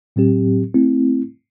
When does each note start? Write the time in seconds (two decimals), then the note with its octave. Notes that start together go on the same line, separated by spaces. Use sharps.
0.16 A2 F#3 C4 G4
0.74 A3 C4 E4